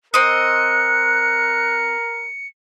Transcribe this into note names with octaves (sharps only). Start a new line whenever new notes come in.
C4 A#4 D#5 F#6 C#7